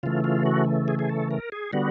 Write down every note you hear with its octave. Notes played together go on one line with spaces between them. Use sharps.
C#3 E3 A3 F4
F4
F#4
G#4
G#4
A4
A#4
G#4
D3 G3 B3 F#4